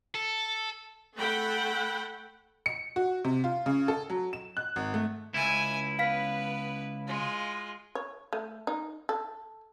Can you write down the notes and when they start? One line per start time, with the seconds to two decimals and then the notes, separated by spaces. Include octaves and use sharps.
0.15 A4
1.16 A3 A4 F#5 G5 B5
2.66 C#7
2.96 F#4
3.24 C3
3.44 F4
3.66 C#3
3.88 A4
4.10 F#3
4.33 E7
4.57 F#6
4.76 G#1
4.94 A3
5.34 C#2 E4 E5 G#5
5.99 B3 B4 F5 B6
7.08 G#3 F4
7.95 C#5
8.33 A3
8.67 D#4
9.09 A4